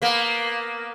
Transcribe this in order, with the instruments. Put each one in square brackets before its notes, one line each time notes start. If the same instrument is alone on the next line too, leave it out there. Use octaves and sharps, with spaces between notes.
[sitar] A#3 B3